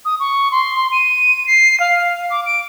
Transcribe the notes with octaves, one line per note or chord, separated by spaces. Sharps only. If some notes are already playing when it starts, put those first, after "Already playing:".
D#6
C#6
C6
D#7
C7
F5
D6
D7